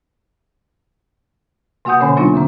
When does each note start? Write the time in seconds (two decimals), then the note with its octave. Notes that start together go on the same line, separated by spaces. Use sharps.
1.85 C3 A#3 F#4 F#5 D#6 G6
2.00 B2 D3 C#4 C#5 G#5 B5
2.17 F#3 A#3 B3 D4 D#4 F4
2.33 E2 D3 C4